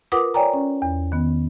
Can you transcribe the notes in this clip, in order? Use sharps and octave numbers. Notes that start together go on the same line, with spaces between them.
F4 A#4 B4 F#5 D6 D#6
C#5 D5 G5 G#5 A#5
C#4
E2
D#3 B3